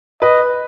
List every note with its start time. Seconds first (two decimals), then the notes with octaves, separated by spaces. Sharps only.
0.22 B4 D#5